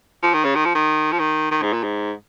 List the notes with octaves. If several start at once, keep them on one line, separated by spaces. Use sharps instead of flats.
F3
D#3
C#3
D#3
F3
D#3
F3
D#3
D#3
G#2
A#2
G#2